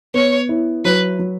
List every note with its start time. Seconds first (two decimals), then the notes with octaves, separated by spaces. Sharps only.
0.14 B3 C#5
0.49 E4
0.85 F#3 B4
1.19 F#3